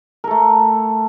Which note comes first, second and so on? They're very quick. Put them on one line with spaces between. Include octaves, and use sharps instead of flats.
A#4 A4 A3